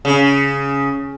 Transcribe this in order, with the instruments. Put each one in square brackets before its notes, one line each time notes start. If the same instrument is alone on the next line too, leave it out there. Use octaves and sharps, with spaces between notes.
[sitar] C#3